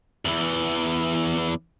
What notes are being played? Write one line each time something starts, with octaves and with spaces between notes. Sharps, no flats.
E2 E3